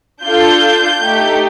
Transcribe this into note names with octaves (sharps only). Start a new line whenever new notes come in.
D4 F4 A4 G6
A3 D#4 G4